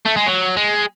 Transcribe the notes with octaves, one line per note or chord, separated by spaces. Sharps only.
A3
G#3
F#3
G#3